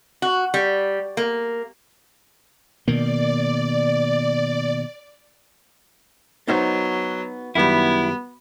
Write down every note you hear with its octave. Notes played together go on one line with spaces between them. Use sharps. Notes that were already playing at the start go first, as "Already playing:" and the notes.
F#4
G3
A#3
B2 D#3 A#3 D5
F#3 B3 D#4 C5
F#2 D#3 G3 B3 E4